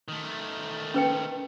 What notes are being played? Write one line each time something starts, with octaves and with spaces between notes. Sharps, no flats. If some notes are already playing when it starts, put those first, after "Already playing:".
D#3 A3
C#4 B4 G5